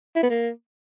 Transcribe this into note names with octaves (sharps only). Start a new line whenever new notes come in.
E4
B3
A#3